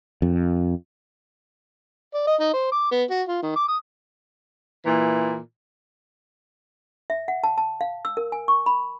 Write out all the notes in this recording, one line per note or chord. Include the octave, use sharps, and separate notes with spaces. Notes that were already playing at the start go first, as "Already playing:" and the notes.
F2
D5
D#5
D#4
C5
D6
B3
F#4
F4
D#3
D6
D#6
A#2 E3
E5
F#5
A5
A5
F5
E6
A#4
G#5
C#6
B5